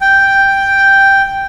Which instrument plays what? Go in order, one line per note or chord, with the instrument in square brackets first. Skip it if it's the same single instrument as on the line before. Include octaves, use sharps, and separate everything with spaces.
[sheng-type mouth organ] G5